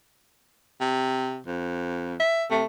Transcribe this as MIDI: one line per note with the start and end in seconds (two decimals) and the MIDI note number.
0.81 1.40 48
1.47 2.17 41
2.20 2.45 76
2.50 2.63 48
2.50 2.65 57